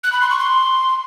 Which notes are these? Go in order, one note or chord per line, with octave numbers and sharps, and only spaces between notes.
F#6
B5
C6
C#6
C6